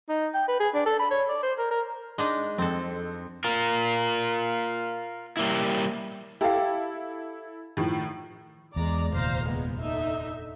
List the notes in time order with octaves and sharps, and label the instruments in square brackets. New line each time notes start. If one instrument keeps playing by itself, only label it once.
[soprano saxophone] D#4
G5
B4
G#4
D4
A4
B5
C#5
D5
C5
A#4
A#4
[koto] G#3 D4 D#4
[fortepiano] F2 [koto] C4 A4
[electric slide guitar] F4 A#4
G3 A#3 E4
[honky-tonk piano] E4 A4 [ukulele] G4 F5
[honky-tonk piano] A2 D#3 F3
[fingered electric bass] E2 [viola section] G#3 D5 A#5
[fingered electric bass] F1 D#2 A#2 [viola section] C5 F5 A#5
[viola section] G#3 B3
D3 D#4 E5